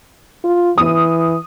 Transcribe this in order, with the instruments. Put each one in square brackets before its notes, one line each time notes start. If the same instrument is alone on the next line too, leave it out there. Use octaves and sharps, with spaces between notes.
[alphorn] F4
[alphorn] E3 [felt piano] D#6